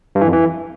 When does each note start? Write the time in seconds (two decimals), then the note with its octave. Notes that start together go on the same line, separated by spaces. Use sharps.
0.15 G2
0.21 E3
0.27 F2
0.33 E3